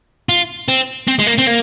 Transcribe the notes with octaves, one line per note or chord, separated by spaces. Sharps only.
F4
C4
C4
G#3
A#3
C4
A#3